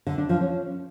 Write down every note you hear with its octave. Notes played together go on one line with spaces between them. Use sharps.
D3
D4
F3
C#4